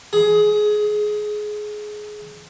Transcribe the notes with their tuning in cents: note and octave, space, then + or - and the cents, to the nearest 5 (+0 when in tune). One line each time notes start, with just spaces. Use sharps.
G#4 +20